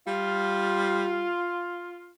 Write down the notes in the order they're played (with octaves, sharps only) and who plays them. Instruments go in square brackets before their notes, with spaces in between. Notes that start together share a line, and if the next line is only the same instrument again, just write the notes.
[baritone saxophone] G3 [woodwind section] F4